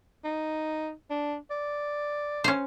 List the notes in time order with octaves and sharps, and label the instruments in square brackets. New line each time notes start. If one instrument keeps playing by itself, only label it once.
[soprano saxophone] D#4
D4
D5
[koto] C#4 C5